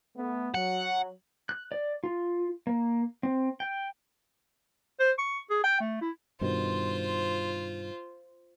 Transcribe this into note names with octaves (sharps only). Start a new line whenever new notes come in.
A3 B3
F#3 F#5
F#6
D5
F4
A#3
C4
G5
C5
C#6
G#4
G5
A3
E4
G2 B2 D#3 F4 C5